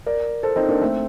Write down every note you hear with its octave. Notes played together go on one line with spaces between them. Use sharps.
A#4 D5
A4 C5
C4 D#4
A#3 D4
A3 C4